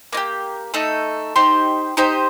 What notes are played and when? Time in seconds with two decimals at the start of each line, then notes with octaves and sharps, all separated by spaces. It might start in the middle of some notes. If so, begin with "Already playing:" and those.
0.13 A#3 D#4
0.17 G4
0.74 A3 D#4 A4
1.36 D#4 G4 C5
1.97 D#4 G4 C5 D#5